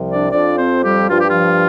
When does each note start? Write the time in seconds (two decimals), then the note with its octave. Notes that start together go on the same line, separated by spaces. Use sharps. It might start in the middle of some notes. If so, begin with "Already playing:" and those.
Already playing: C2 C3 F3
0.11 D4 D5
0.31 F2 F3 D4 D5
0.57 C4 C5
0.83 G3 G4
1.10 G2 F3 F4
1.19 G4
1.29 F3 F4